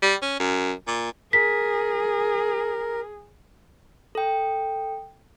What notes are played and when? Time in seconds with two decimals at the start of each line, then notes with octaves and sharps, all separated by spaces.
0.02 G3
0.22 C#4
0.40 F#2
0.87 A#2
1.33 G#4 A#4 B6
4.15 A4 G5